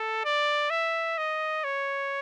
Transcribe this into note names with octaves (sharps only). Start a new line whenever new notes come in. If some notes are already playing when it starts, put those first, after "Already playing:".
Already playing: A4
D5
E5
D#5
C#5